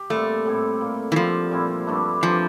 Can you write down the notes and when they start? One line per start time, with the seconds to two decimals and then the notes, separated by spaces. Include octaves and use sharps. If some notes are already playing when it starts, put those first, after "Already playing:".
Already playing: G4
0.10 A#2 G3 A3 C4
0.45 A2 G3 C4 E4
0.81 A#2 G3 A#3
1.12 E3
1.16 D3 F3 G3 C4 G4
1.51 A#2 G3 C4 E4
1.87 G2 D3 A3 D4
2.22 E3 F3 A#3 D4 G4